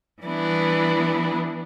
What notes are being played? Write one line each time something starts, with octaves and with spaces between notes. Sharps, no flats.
E3 G3 B3 D4 E4